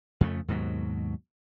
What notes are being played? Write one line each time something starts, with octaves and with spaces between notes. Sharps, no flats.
F2 C#3 A3
D#2 G#2 B2 F#3